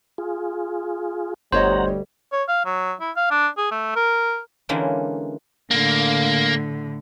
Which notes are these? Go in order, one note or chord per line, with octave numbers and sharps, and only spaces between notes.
F4 G#4
G1 D2 G3 C5 C#5 D#5 F#5 A#5
C#5
F5
F#3
E4
F5
D4
G#4
A3
A#4
D3 E3 G#3 A#3 C#4 D#4
A2 D3 A#3